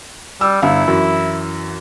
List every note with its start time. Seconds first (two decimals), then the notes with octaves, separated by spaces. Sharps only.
0.41 G3 E6
0.62 G1 E4 F5
0.88 F#2 E3